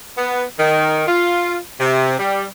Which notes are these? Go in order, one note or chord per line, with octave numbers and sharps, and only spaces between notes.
B3
D#3
F4
C3
G3